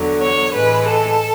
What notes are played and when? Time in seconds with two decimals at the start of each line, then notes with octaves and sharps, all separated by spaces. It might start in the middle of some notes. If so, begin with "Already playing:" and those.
Already playing: E2 D3 F#3
0.21 C#5
0.53 A2 E3 G#3 B4
0.87 A4